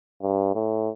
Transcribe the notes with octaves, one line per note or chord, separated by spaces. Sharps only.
G2
A2